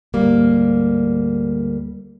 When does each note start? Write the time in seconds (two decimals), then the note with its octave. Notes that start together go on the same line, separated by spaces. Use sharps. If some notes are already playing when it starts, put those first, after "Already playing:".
0.14 D2 G#2 G3 A#3